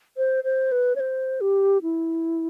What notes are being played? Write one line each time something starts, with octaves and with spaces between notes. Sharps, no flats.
C5
C5
B4
C#5
C5
G4
E4